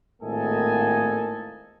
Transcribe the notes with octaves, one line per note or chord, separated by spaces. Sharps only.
G#1 A2 A#3 A4 D#5 G#5